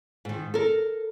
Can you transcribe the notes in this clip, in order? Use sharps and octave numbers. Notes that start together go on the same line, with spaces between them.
G#2 D#3
A4 A#4